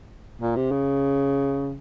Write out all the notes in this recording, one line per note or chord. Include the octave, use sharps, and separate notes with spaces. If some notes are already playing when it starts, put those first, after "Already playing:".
A#2
C3
C#3